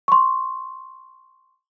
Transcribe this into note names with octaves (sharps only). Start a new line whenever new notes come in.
C6 C#6